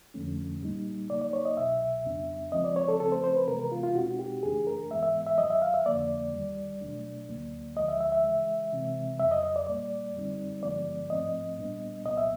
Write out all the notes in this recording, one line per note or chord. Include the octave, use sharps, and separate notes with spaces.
F2 D3 F3 A3 C#4
A#2 G3 A#3 D#4
C#3 F#3 A#3 D#4 D5
D5
C#5
D#5
C2 B2 F#3 E5
F2 C#3 F#3 B3 D4
C#2 C#3 F3 G#3 C4 D#5
D5
C#5
A4
C#3 F3 A3 C4 A4
C5
C5
B4
C3 E3 G#3 B3 A#4
A#4
F4
F4
B2 G#3 C4 D#4 F#4
G4
F#2 C#3 E3 A3 D4 G#4
A#4
G#2 E3 G#3 B3 E5
E5
E5
F#2 D#3 F#3 D#5
E5
F5
E5
F2 D3 F3 A#3 D5
D#2 D#3 G3
B2 F#3 A3 D4
D2 D3 F#3 A#3
D2 D3 F3 G#3 D#5
E5
E5
E5
C#3 E3 G#3
C3 E3 G#3 C4
F2 C#3 F#3 E5
D#5
D#5
D5
A#2 G3 A#3 D5
F#2 D3 G3 C4 D#4
G2 D3 F3 G#3 B3 D5
G#2 F3 A3 C4 D#5
A#2 G3 B3 D4
C2 A#2 F#3 B3 D#5
E5